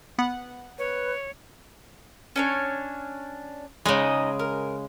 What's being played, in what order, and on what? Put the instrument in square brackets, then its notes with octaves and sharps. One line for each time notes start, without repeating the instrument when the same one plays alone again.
[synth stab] B3 F#5
[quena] B4 [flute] C#5
[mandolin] C#4 D4 C#5
[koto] C#3 G#3 [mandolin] D#4 D#5
[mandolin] A#4